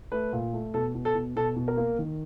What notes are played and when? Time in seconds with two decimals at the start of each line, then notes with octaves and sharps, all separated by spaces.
0.12 A3 B4
0.33 A#2
0.54 A3
0.74 B2 A4
0.95 B2
1.05 A4
1.15 B2
1.36 B2 A4
1.56 B2
1.68 A#4
1.77 A#3
1.99 D#3